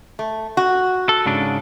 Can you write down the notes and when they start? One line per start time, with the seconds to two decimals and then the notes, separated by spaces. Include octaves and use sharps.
0.19 A3
0.57 F#4
1.09 A4
1.26 G#2 C#3 D4